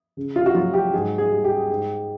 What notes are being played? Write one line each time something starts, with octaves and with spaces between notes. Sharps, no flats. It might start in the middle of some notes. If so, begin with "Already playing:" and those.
C#3
F4
F#4
F#3 F4
G4
G#2 G#4
G#4
G3
G4
G#2